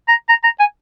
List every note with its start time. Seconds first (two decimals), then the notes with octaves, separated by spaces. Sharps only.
0.08 A#5
0.29 A#5
0.44 A#5
0.60 G#5